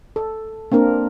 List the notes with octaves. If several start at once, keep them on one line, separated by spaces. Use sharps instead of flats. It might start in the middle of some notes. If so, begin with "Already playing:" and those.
A4
A#3 C4 D4 A#4